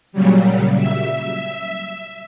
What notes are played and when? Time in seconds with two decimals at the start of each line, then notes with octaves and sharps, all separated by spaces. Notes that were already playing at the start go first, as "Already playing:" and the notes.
0.12 A#2 C#3 F#3 G3
0.78 E5